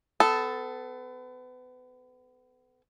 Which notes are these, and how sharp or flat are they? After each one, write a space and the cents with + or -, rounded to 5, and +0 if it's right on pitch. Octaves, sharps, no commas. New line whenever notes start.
B3 +35 A4 +0